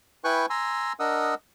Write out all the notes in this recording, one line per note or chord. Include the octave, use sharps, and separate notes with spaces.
E4 B4 G5 G#5 C#6 F#6
G#5 A#5 C6 E6
D4 A#4 D#5 F#5 D#6 E6